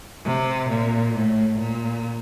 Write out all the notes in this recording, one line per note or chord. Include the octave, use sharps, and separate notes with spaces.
C3
A#2
A2
A#2